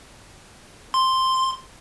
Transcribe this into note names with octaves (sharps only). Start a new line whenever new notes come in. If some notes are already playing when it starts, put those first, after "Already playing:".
C6